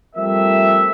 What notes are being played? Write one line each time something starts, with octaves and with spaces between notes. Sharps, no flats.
F3 G3 A3 C4 A#4 E5